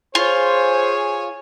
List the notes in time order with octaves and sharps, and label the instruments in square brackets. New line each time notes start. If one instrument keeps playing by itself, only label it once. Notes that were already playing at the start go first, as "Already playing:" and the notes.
[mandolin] F4 [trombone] G#4 [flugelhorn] C5 [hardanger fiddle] C#5 G#5